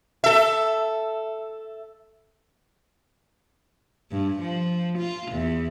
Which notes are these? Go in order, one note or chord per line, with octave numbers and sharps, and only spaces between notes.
A4 E5
G2
F3
F4
E2